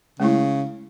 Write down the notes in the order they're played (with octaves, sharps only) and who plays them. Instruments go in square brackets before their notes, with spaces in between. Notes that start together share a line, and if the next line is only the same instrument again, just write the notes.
[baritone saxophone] C#3 [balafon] G#3 A3 E4